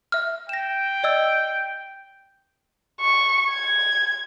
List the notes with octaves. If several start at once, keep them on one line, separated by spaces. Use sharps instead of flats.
E5 F6
G5 A#6 E7
D5 D#5 E6
C#6
G#6